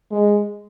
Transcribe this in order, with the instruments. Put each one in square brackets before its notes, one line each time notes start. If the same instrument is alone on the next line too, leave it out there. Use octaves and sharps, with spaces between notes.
[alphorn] G#3